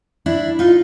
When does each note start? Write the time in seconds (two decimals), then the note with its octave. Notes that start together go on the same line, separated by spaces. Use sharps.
0.26 D4 E4
0.59 D#4 F4